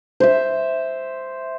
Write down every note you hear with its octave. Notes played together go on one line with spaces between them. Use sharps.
C5 E5